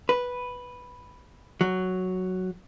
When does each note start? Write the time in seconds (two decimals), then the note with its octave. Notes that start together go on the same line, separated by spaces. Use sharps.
0.09 B4
1.61 F#3